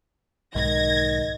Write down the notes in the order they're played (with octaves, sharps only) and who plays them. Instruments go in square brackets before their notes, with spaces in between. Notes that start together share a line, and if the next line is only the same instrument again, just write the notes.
[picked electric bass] B1 G#2 [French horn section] D#3 D#5 [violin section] G#6 A#6